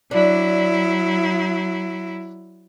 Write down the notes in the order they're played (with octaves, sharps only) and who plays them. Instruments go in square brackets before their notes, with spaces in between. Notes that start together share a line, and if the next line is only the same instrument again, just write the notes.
[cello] F#3 E4 [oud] D4